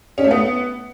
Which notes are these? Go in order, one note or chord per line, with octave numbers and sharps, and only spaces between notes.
C#4
A3
B3